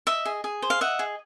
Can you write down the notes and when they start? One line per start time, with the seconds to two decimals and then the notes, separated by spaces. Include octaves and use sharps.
0.07 D#5 E5
0.25 G#4
0.44 G#4
0.62 C5
0.70 F5
0.81 D#5 E5 F#5
0.99 G#4